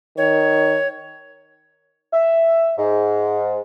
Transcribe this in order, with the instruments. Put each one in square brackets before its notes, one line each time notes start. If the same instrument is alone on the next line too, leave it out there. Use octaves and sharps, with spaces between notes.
[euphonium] D#3 [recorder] C#5
[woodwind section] E5
G#2